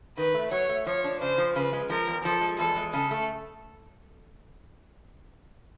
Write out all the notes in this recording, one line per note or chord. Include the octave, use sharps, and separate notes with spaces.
D#3 B4
A3
F#3 C#5
A3
F3 C#5
D4
C#3 C5
F3
C#3 B4
G#3
F3 A#4
E2
F3 A4
G#3
E2 A4
G#3
C#3 A4
A3